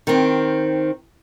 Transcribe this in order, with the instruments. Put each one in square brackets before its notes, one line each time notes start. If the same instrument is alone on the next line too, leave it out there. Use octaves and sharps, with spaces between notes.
[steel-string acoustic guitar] D#3 C4